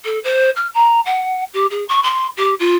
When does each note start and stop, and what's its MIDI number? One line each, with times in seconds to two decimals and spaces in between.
0.05 0.19 69
0.24 0.50 72
0.56 0.68 89
0.74 1.00 82
1.05 1.44 78
1.54 1.66 67
1.70 1.84 68
1.88 2.01 85
2.03 2.27 84
2.37 2.54 67
2.59 2.77 65